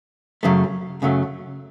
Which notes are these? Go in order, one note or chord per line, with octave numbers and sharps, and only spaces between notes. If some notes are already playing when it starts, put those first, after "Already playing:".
F#2 C#3 F#3 A3
F#2 C#3 F#3 A3